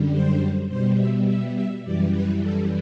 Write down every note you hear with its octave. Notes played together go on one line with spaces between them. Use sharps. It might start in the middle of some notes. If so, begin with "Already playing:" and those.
Already playing: F#2 D3 G3
C5
B2 G3 C5
E5
E5
E5
F#2 E3 G3 D5
B4
A4